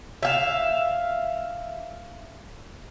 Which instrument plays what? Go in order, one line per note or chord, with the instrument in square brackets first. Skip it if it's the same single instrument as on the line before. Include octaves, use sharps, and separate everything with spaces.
[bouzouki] E5 F5